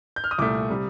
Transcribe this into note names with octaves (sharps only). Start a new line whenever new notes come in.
G6
F6
D#6
C2 A#2 A3 D6
C3 G3